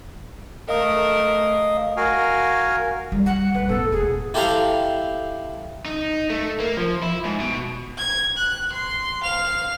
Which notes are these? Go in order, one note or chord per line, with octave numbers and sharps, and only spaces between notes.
A3 A#4 D#5 F5 D#6
F#4 A#4 F5 G#5
G3 B3
F#5
E1 D2 B4
A2 B3 A4
E1 G#4
E4 G4 A4 C5 F5 A#5
D#4
A3
A#3
F3
E4
G#2
B2
G#6
F#6
C6
F5 F7